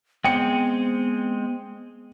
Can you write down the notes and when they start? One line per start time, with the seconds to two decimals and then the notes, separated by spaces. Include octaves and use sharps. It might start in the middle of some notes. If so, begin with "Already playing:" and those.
0.24 G#3 B3 C4 G#4 G5 C#7